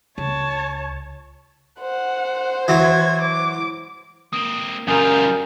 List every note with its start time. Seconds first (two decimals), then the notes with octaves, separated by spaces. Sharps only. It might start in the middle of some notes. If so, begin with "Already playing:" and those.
0.18 C#2 C#5 A5
1.81 C5 F#5
2.68 E3 F#3 G#6
3.21 D6
4.33 A#3 C4 D#6
4.88 F#2 C#3 G3 F4 A#4 G#5 D#6 G6